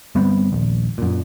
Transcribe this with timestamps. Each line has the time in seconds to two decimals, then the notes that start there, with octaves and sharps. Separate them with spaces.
0.15 G1 G3 B3 C4
0.52 D#1 A#1
0.98 F#2 A#2